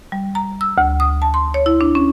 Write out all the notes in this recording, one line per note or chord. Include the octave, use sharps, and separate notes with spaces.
G3
A#5
E6
D2
D#6
A5
C6
C#5
E4
D4
C#4